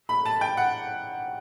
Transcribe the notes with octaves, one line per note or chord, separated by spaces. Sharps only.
B5
A5
G5
F#5